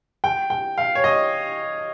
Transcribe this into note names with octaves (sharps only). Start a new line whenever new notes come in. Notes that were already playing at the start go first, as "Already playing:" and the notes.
G5
G5
F5
C#5
D#5